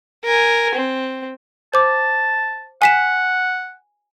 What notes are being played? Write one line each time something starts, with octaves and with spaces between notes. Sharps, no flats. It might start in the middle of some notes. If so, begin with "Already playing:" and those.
A#4 G#5
C4
C5 A5 D6
F#5 G#5 B6 E7